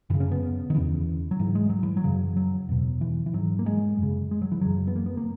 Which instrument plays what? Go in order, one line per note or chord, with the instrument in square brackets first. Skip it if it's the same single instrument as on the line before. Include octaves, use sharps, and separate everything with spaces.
[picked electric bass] F#2 E3
C#3
C#4
B3
D#3
E2 C#3 E3
F#3
G#2 E3
G#3
F#3
E3
F#3
F#2 C#3
F#3
E2 B2
E3
E3
G#2 F#3
A#3
G#3
F#2 C#3
G#3
F#3
E3
F#2 C#3 F#3
B3
A#3
B3
A#3